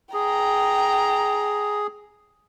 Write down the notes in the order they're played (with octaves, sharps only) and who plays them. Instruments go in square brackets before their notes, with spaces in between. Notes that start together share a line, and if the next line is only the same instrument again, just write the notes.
[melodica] G#4 [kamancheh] G5 A#5